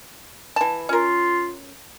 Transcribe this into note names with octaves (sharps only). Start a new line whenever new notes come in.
E3 A5
C#4 F4 A#4